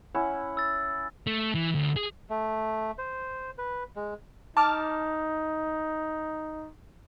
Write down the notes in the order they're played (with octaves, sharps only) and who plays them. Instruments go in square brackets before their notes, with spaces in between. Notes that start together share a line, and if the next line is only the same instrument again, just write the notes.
[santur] C#4 E4 F#5
[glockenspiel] E6 A6
[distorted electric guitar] A3
E3
D2
G#4
[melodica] A3
C5
B4
G#3
[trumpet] D#4 [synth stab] A5 D6 F6